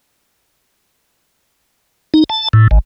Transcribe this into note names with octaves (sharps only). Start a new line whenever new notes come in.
D#4
A5
A2
G#1